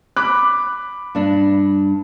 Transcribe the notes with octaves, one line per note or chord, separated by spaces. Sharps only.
B5 D6 F#6
G2 D4